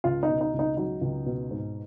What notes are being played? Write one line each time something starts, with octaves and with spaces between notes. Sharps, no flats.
C#2 F4
D#4
B2
D#4
C#2
D#4
F#3 D#4
C#2
B2
G#2